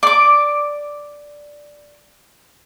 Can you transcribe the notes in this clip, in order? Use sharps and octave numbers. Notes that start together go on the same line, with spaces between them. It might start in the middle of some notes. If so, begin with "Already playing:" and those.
D5 D6